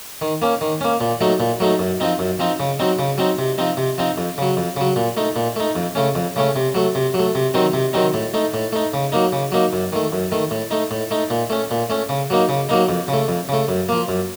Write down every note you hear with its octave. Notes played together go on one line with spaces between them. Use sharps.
D#3
A#3 C#4
D#3
A#3 C#4
A#2
F#3 A3 D#4
A#2
F#3 A3 D#4
F#2
F3 C4 D#4
F#2
F3 C4 D#4
C#3
F#3 C4 D#4
C#3
F#3 C4 D#4
C3
F3 C4 D#4
C3
F3 C4 D#4
F2
C#3 F#3
F2
C#3 F#3
A#2
A3 D#4
A#2
A3 D#4
F2
C#3 A3 C#4
F2
C#3 A3 C#4
C3
F#3 A3
C3
F#3
A3
C3
D#3 F#3 C4 D#4
C3
D#3 F#3 C4 D#4
A2
A3 D#4
A2
A3 D#4
C#3
F#3 A#3 D#4
C#3
F#3 A#3 D#4
F#2
D#3 A3
F#2
D#3 A3
A2
A3 D#4
A2
A3 D#4
A#2
A3 C#4
A#2
A3 C#4
C#3
F#3 A#3 D#4
C#3
F#3 A#3 D#4
F2
C#3
A3
F2
C#3 A3
F#2
F3 A#3
F#2